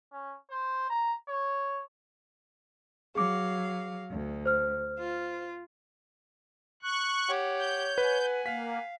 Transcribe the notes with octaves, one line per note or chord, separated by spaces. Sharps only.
C#4
C5
A#5
C#5
F#3 G#4 F5 D6
D2
C5 F6
F4
C#6 F#6
G4 C#5 F#5
G6
B4 F#5 G#5
A#3 F5 B6